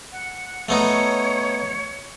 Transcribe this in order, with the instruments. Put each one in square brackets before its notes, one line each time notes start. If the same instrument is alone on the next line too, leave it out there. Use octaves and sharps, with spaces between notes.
[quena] F#5
[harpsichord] A3 B3 D#4 [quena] C#5